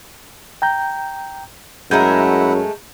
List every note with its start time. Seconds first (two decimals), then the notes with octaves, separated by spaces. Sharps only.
0.62 G5 A#5 G6
1.91 F#2 G#3 A3 E4 A#4 F#5 G6